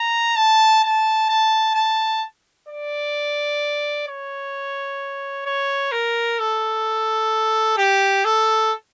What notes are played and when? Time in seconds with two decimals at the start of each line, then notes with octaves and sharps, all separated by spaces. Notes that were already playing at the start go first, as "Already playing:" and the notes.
Already playing: A#5
0.36 A5
0.84 A5
1.29 A5
1.75 A5
2.69 D5
4.08 C#5
5.46 C#5
5.92 A#4
6.39 A4
7.77 G4
8.25 A4